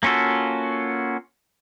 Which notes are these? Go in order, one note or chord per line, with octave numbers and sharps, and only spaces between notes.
A#3 C#4 F4 F#4 A4